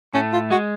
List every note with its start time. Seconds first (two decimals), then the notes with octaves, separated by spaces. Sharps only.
0.14 A2 A3 C#4
0.33 F4
0.50 G#3 F#4